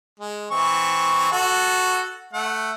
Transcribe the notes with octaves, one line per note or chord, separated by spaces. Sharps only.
G#3
E3 C4 C#6
F#4 A4
A3 F#5